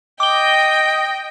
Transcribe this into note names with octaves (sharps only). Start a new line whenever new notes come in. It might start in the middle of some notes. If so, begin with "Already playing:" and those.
D#5 G5 D6 G7